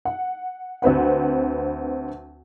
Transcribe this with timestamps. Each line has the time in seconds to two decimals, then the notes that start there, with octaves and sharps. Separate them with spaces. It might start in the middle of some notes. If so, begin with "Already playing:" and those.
0.05 F#5
0.82 D2 C4 B4 F#5